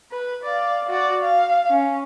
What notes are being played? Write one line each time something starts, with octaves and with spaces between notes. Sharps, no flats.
B4
D5 F5
F#4 D5
F5
C#4